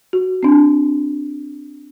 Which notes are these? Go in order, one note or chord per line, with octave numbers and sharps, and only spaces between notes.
F#4
C4 D4